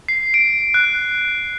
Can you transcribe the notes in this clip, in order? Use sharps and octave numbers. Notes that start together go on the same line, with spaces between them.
C7
D7
F#6